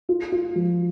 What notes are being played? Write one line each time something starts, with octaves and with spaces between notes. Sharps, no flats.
F4
F4
F3